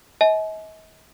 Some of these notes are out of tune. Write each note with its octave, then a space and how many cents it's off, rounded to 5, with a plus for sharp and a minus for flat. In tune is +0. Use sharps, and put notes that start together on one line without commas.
D#5 +40 G#5 +45